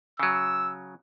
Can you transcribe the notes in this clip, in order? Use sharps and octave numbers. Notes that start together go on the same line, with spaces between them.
C#3 F#3 E6